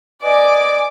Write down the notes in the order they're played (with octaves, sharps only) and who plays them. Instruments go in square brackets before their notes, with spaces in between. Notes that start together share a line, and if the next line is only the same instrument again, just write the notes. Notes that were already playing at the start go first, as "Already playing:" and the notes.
[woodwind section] B4 D#5 G#5 [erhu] D5 [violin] D6